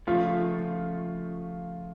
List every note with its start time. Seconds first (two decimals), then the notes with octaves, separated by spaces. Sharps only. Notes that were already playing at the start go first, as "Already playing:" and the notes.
0.07 C#3 F3 A3 F4